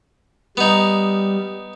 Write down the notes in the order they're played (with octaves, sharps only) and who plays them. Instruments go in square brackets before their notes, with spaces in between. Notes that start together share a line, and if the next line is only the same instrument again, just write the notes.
[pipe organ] G3 [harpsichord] B3 D#4